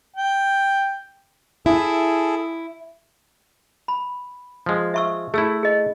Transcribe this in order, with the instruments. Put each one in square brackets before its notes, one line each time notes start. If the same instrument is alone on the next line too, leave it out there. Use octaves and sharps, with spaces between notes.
[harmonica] G5
[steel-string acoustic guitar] E4 [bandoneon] G#4 A4
[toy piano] B5
[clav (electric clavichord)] F3 G#3
[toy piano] E5 C#6 E6
[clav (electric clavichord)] A3 E4 [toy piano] G#4 E6
[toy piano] G#4 D#5